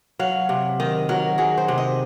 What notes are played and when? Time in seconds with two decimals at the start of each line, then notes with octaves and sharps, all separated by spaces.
0.19 F#3 F5
0.49 C3
0.80 D#3 D#5
1.09 F#3 A#4
1.38 F#3 G#4
1.58 C5
1.68 C3
1.78 D#5